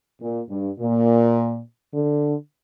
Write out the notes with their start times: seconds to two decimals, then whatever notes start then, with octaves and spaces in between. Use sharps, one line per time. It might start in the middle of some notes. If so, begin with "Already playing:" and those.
0.20 A#2
0.49 G2
0.79 A#2
1.94 D3